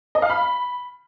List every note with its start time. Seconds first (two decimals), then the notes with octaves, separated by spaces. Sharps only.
0.15 D#5
0.22 F5
0.30 B5